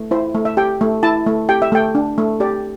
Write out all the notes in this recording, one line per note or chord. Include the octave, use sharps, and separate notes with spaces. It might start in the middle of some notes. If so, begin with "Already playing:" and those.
Already playing: A3
E4 C5
A3
E5
G4 G5
A3
E4 A5
A3
G4 G5
E5
A3 G5
D4
A3
G4 D5